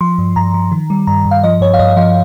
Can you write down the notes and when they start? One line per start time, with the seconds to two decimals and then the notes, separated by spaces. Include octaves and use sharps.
0.01 F3 C6
0.18 G2
0.36 G2 A#5
0.54 F3
0.72 D#3
0.90 G3
1.07 G2 A#5
1.25 G2
1.31 F5
1.43 F3 D#5
1.61 G2 C#5
1.74 F5
1.79 G2 D#5
1.97 F3 F5